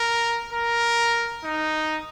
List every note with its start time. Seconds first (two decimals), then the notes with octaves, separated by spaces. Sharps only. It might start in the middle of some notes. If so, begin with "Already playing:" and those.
Already playing: A#4
0.53 A#4
1.44 D#4